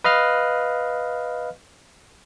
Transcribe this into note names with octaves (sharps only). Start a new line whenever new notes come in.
B4 D#5 F5 F6